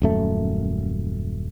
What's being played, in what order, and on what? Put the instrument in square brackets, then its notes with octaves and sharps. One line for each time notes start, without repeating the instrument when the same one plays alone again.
[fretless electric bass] D#1 F#2 A3